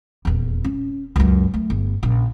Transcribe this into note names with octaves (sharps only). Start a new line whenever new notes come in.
D#1 E2
C#4
C#2 F#2
A3
G1
A#1 C#3